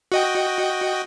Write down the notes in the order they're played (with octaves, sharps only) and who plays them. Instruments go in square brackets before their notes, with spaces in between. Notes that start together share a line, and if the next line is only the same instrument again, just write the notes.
[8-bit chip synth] F#4 D#5 G5